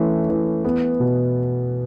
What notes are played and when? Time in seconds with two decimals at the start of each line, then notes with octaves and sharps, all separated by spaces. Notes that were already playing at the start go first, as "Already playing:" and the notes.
Already playing: E3 A3 C#4
0.29 E3
0.65 B3
1.00 B2